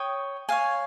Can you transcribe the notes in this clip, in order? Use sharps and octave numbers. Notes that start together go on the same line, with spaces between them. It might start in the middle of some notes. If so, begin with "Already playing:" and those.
Already playing: C#5 G5 D#6
C#5 F5 G#5